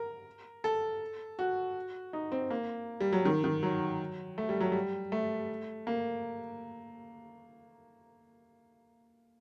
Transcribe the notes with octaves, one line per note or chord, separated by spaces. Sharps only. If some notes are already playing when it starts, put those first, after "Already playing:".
Already playing: A#4
A4
F#4
D#4
C4
A#3
G3
F#3
D#3
D#3
F#3
A3
G3
F#3
G3
A3
A#3